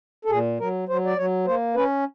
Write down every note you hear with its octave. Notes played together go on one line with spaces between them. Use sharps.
A4
A#2 G#4
F#3 A#4
F#3 C5
D5
F#3 C#5
A#3 C5
C#4 B4